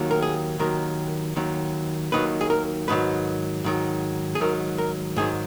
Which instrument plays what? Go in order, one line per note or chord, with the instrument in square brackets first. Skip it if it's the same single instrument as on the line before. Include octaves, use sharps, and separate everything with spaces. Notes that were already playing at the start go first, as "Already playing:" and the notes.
Already playing: [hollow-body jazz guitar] D#2 D#3 F#3
A#4
G#4
D#2 D#3 F#3 A#4
D#2 D#3 F#3
D#2 D#3 F#3 B4
G#4
A#4
G#2 D#3 F#3 B4
G#2 D#3 F#3
G#4
G#2 D#3 F#3 A#4
A#4
G#2 D#3 F#3 G#4